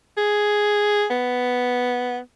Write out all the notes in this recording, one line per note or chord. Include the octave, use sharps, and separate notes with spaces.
G#4
B3